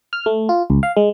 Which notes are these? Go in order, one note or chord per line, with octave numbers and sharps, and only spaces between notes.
F6
A3
F4
C#2
F5
G#3